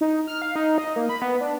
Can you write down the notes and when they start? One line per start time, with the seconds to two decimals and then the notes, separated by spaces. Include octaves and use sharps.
0.01 D#4
0.27 F6
0.42 F5
0.56 D#4
0.78 D#5
0.96 A#3
1.09 B5
1.22 B3
1.41 D4